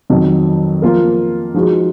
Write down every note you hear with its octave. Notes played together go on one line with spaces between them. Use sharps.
F2 D#3 F#3
F3 A#3 F4 A#4
F3 G#3 D#4 F#4